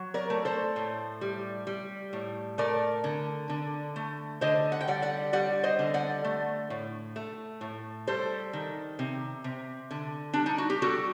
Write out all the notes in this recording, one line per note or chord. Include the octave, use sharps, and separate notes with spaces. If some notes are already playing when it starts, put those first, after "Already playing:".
Already playing: F#3
A#4 D5
A3
A4 C5
A2
G3
G3
A2
A3 A#4 D5
D3
D3
A3
D3 C5 D#5
F#5
G5
G3 D5 F#5
D5 F#5
G3 D5 F#5
C5 D#5
D3
D5 F#5
A3
A2
A3
A2
G3 A4 C5
D#3
C3
C3
D3
G3 D4
D#4
F#4
G4
G3 F#4 A4